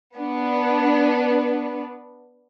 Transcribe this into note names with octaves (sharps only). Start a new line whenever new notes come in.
B3 D4